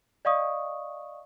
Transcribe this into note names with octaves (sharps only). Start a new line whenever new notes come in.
D5 D#5 F5 C#6 D#6